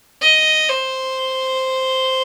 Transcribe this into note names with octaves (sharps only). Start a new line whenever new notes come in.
D#5
C5